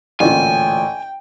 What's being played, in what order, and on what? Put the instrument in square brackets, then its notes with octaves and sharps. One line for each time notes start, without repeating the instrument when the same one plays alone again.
[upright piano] A1 D2 A#2 [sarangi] G5 [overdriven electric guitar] G#5